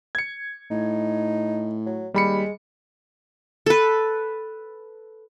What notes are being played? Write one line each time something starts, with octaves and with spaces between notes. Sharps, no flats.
G#6 C#7
A2 D#4
F#3
D#2 G3 G#3 B5 C#7
A4 B4